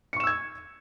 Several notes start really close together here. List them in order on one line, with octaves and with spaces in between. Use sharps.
C#7 C#6 E7 E6 G#6